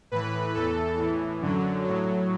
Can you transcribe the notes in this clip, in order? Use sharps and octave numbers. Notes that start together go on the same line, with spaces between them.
A2 E3 B4
E2 E3 A4
A2 E3
F#2 D3 F#3
A2 F#3